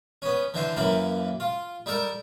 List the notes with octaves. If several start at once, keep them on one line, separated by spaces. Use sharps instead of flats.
B3 C#4
D3 E3 C5
F#2 E3 A#3 B5
F4
G3 D#4 A4 A#4